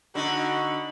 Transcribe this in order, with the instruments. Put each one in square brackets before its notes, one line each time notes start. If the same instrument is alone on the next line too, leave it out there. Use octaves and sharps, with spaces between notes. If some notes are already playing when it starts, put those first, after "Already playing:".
[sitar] D3 D#4 [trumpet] F#4 [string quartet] B5 C#6